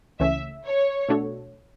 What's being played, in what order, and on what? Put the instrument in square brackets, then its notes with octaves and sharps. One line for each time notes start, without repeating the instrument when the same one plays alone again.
[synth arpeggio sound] C#2 C#3 E3 A3 C#4 [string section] E5
[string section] C#5
[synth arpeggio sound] B2 A3 D4 F#4 A4